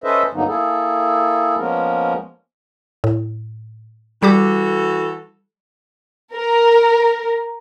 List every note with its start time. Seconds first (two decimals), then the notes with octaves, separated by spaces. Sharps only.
0.04 C#4 A4 B4 C5 D#5 E5
0.34 G2 D3 F#3 A#3 B3 D#4
0.47 A#3 E4 G#4 A4
1.58 F3 G#3 A#3 B3 C#4 A#4
3.04 A2
4.23 E3 G3 F#4 G4 A4 D6
6.34 A#4